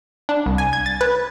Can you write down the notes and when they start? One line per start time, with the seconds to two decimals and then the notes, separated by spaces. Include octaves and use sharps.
0.29 D4
0.46 C2
0.58 G#5
0.73 G#6
0.86 A6
1.01 B4